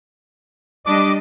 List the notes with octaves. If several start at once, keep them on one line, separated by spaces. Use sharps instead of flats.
G3 D4 D#5 D6